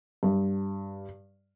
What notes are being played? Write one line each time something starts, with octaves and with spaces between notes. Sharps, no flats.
G2